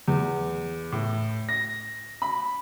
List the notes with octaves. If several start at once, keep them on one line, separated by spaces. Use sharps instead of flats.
E2
A2
A#6
B5